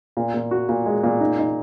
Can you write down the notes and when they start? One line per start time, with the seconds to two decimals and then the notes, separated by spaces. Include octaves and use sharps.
0.17 A#2
0.34 A#2
0.51 F#4
0.69 A#2
0.86 G#3
1.03 A#2
1.20 D#4
1.38 D#4